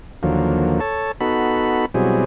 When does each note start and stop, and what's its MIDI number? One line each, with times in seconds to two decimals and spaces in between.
0.23 0.80 39
0.23 0.80 50
0.23 0.80 53
0.23 0.80 54
0.23 0.80 58
0.80 1.12 69
0.80 1.12 73
0.80 1.12 81
1.21 1.86 59
1.21 1.86 63
1.21 1.86 66
1.21 1.86 69
1.21 1.86 83
1.94 2.24 47
1.94 2.24 54
1.94 2.24 55
1.94 2.24 60
1.94 2.24 64
1.94 2.24 68